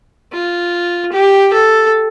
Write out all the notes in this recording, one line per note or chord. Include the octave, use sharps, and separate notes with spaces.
F4
G4
A4